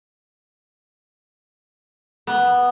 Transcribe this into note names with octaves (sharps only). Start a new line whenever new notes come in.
B3